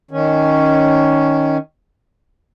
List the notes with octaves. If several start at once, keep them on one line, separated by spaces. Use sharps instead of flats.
D#3 C#4